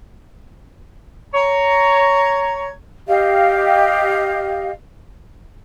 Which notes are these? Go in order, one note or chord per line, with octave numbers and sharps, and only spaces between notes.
C#5 A#5
G4 D#5 F5